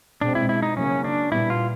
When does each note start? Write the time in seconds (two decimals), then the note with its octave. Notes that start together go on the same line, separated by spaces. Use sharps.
0.21 B2 G#3 C4 D4
0.35 E4
0.49 E4
0.63 D#4
0.77 C#3 F#3 A#3 C#4
1.04 D4
1.32 A#2 G3 B3 E4
1.50 F4